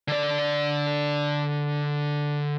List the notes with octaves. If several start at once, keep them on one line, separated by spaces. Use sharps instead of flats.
D3 D5